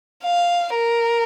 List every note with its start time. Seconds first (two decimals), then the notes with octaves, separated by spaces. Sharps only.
0.25 F5
0.75 A#4